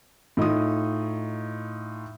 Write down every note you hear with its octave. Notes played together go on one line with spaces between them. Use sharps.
A2 D#4 F4 D#6